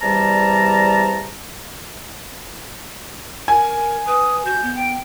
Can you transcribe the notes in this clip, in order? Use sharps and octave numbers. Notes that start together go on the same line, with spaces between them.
E2 C3 G3 D5 A5 A#5
A#4 G#5
B4 D#6
F#4 G6
B3
G5